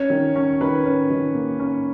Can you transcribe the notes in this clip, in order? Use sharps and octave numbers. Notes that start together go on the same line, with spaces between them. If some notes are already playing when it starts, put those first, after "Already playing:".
Already playing: C#4 C#5
D#3
C#4
D#3 B4
C#4
D#3
A#3
C#4